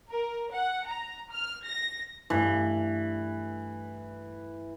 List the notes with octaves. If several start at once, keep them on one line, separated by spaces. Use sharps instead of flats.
A#4
F#5
A#5
F6
A#6
G2 E3 A3